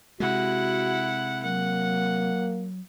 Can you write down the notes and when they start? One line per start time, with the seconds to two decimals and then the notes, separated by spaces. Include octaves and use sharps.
0.20 C3 G#3 E4 F#4 F#5
1.43 F#3 A#3 F#5